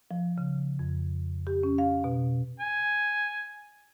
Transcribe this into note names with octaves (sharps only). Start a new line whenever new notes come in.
F3
C#3
F2
G4
C#4
F5
B2
G#5